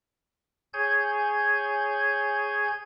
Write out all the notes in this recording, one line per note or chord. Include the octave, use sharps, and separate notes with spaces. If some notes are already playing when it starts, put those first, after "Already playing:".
G#4 C#5 G#5 G6 G#6